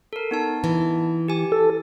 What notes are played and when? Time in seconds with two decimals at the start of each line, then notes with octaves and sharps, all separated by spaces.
0.13 A4 A#4
0.31 B3 D#4 A5
0.64 E3
1.28 G4 G#5
1.52 A4